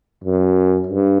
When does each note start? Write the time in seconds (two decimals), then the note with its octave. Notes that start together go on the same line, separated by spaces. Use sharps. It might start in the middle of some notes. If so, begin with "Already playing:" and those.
0.24 F#2
0.87 G2